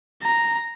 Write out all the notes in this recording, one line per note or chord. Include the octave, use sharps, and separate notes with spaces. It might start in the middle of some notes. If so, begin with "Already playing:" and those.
A#5